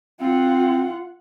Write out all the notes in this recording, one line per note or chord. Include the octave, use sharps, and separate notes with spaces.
C4 F4 F#5